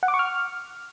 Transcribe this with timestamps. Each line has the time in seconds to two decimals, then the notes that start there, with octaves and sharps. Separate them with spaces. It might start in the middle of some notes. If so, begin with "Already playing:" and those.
0.03 F#5
0.08 D6
0.14 C#6
0.19 F6